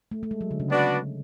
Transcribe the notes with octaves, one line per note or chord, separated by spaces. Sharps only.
A3
A3
G#3
F#3
D3
C#3
B3 D4 F#4 B4 D5